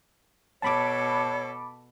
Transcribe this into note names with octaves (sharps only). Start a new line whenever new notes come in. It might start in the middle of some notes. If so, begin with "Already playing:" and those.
B2 A4 C#5 A5 B5 D6